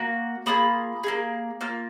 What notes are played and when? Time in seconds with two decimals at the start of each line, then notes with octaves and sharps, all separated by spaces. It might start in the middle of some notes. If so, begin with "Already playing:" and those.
Already playing: A#3 F#4
0.46 A#3 F4 G#4 B5 D#6
1.03 A#3 F4 G#4
1.61 A#3 F4 F6